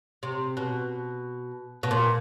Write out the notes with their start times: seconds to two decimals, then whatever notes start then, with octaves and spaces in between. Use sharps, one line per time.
0.23 C3
0.57 B2
1.83 B2
1.91 A#2